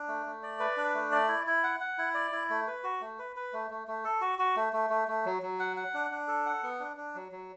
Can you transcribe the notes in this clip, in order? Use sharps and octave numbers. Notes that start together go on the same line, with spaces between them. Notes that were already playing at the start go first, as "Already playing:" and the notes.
Already playing: D4
A3
A3
D5
B4
D4
A3
D5
E4
E4
F#5
F#5
E4
D5
E4
A3
B4
F#4
A3
B4
B4
A3
A3
A3
A4
F#4
F#4
A3
A3
A3
A3
F#3
F#3
F#5
F#5
D4
D4
A4
F#5
B3
D4
D4
F#3
F#3